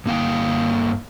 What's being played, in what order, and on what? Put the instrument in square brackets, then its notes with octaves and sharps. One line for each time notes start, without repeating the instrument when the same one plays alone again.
[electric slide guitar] G2 A#3 F5 G5